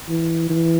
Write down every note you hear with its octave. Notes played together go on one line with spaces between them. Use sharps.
E3
E3